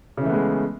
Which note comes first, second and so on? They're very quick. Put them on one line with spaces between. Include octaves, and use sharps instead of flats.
C#3 E3 A3 B3 G#3